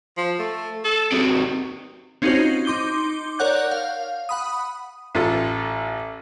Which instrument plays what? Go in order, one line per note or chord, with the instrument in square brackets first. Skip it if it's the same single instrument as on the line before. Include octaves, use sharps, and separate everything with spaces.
[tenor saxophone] F3
A3
A4
[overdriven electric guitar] C3 F#3 [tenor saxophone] G#4
[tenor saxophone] D#3
[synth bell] C4 C#4 D#4 F4 F#4 C5
D#4
D#4 C6 D6 G6 G7
A#4 C#5 D5 F#5 F#6 G6
F5
F#5 B5 D#6
[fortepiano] A1 F4 A4